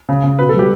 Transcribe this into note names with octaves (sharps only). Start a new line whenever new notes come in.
C#3
C#3
B2 B4
A4
G3 G4